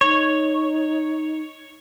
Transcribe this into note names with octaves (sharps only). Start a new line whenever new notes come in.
D#4 C#5